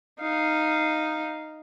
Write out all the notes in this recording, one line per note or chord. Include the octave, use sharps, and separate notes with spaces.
D#4 F5